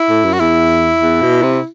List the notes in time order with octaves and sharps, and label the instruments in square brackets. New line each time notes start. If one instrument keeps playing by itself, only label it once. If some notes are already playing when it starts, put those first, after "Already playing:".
Already playing: [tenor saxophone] E4
[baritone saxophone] A2
F#2
[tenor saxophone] F#4
[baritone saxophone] E2 [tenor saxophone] E4
[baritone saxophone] E2
B2
C3